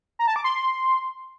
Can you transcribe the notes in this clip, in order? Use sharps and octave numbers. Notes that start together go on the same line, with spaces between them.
A#5
A5
D6
C6